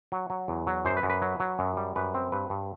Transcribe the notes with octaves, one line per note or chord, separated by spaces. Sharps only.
F#3
F#3
E2
F#3
F#2 C5
B4
F#2
B4
F#3
F#3
F#2
G3
F#2 B4
C4
G2 B4
G2